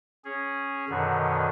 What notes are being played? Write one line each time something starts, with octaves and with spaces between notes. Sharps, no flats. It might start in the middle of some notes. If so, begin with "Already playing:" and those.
C#4 G#4
F#2 B2 D3 D#3